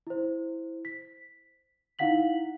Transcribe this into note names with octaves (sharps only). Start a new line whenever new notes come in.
E4 C5
B6
D#4 E4 F5 F#5 B6 F#7